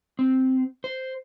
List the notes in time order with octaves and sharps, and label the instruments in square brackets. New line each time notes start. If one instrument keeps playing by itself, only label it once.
[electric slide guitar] C4
C5